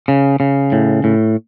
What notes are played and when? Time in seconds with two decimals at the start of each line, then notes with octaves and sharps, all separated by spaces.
0.08 C#3
0.40 C#3
0.72 A2
1.04 A2